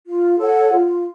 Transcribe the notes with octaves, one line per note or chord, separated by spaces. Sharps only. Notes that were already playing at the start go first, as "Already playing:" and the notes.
F4
A4 C#5 F#5
F4